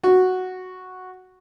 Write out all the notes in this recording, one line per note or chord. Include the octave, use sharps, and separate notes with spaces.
F#4